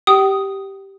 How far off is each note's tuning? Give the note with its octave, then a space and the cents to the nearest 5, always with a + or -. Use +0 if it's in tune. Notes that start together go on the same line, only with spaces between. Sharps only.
G4 -10 G5 -35 D#6 +0